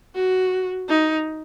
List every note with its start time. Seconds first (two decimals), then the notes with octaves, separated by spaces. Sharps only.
0.15 F#4
0.89 D#4